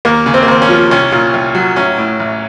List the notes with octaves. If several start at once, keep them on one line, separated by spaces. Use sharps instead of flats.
D#2 A#3
C#3
C4
A#3
D#2 C4
C#4
F3
C2 C#4
A#2
C2
F#3
A1 C#4
A2
A1